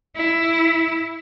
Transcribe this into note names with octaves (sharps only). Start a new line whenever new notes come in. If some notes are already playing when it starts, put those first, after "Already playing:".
E4